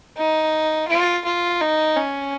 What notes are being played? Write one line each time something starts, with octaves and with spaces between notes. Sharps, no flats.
D#4
F4
F4
D#4
C#4